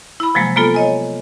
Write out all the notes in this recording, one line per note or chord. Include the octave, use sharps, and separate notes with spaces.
E4 B5
C3 F3 F#3 G#3 A#3
G#3 A#3 B3 F4 A4
C#5 D#5 G#5